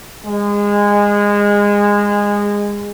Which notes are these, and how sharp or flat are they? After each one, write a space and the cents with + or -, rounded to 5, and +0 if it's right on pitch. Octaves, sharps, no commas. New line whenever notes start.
G#3 -20